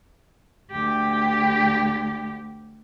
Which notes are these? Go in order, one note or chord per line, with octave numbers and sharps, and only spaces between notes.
D2 G4